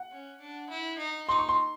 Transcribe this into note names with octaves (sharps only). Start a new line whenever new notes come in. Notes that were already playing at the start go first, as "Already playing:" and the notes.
Already playing: F#5
C#4
D4
E4
D#4
D#4 C6
C#6
C6